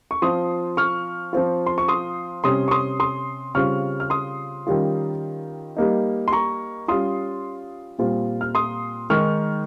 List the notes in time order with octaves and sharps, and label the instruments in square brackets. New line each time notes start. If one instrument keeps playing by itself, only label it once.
[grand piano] C#6
F3 C4 F4 C6 D#6
C#6 F6
F3 C4 F4
C6
C#6
C6 D#6
C3 G3 C#4 C6 D#6
C#6
C6 D#6
C6 D#6
C#3 G3 C4 F4 C#6 F6
F6
C6 D#6
D#3 G3 C#4 F4
G3 A#3 D#4
C6
A#5 C#6
G3 C#4 F4 C6 D#6
A#2 G3 C4 F4
F6
C6 D#6
D#3 G#3 D#4 C#6 F6